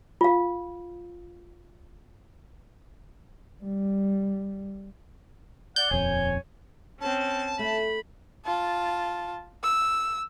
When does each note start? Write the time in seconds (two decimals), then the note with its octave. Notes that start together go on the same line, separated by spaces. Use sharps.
0.21 F4 F5
3.64 G3
5.76 D5 F#5 G6
5.91 D#1 F2 C#5 G#5
7.00 C4 C#4 A5
7.59 A3 B5
8.45 F4 A5
9.63 E6